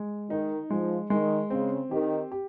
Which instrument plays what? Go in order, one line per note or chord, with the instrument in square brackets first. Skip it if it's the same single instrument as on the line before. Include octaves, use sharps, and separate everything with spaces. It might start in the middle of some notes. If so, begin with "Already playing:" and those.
Already playing: [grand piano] G#3
[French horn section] D#3 [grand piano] D#4
[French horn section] F3 [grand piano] G#3
[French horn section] D#3 [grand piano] G#3
[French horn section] C#3 [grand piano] C4
[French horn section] D#3 [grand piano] G4
[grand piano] G4